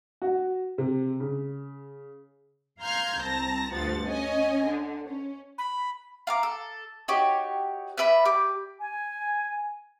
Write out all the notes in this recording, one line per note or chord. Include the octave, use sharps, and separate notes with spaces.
F#4
C3
C#3
F5 A#5 C6 F6 G6 G#6
C2 C4 A5 A#5 A#6
D2 G2 F3 F#5 A6
C#4 D#5 G#5
D3
C#4
B5
F5 A#5 D6
A4
D#4 F#4 G4 C#5
B4 D5 E5 B5
G4 D6
G#5